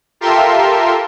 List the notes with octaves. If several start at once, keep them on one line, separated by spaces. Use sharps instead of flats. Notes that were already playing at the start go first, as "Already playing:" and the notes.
F4 G4 A4 A#4 E5 C6